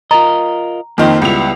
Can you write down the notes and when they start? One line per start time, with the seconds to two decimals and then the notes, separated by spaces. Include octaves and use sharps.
0.11 F4 A#4 D#5 A#5
0.98 F2 D#3 A#3 C5
1.22 C#2 G3 B3 E4 F7